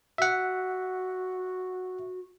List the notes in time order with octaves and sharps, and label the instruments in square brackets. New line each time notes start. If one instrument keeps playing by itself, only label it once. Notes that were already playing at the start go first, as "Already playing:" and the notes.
[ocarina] F#4 [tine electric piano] E5 F#5